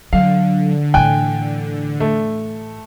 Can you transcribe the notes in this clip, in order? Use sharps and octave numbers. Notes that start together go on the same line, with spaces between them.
D3 F#3 F5
A2 E3 G5 G#5 F#6
A3